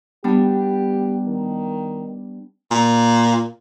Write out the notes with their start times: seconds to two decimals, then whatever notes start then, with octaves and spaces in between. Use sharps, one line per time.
0.24 G3 B3 D4 G4
1.27 D#3
2.71 A#2